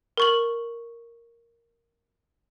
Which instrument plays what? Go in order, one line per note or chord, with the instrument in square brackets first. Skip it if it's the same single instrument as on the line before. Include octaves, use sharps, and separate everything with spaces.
[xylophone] A#4 C#6 F#7